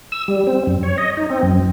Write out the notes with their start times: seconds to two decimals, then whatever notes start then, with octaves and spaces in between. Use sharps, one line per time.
0.12 E6
0.28 G3
0.47 C4
0.67 F#2
0.83 C#5
0.98 D#5
1.17 D#4
1.30 C4
1.43 F#2